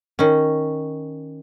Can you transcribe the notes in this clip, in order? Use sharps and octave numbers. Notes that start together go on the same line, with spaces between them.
D#3 C#4